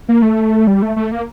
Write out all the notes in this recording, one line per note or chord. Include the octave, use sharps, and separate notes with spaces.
A#3
A3
G3
A3
A3
A#3